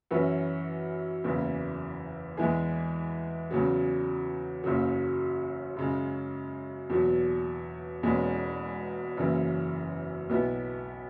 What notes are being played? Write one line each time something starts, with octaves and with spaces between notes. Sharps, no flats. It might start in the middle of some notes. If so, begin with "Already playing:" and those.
F#2 E3 C#4 F#4 B4
F#1 E2 C#3 E3
E2 E3 G#3 E4 G#4
E2 C#3 F#3
F#1 F#2 C#3 F#3
F#2 C#3 G#3
E2 B2 F#3
E1 E2 B2 G#3 C#4
F#1 F#2 C#3 E3
B1 B2 B3 E4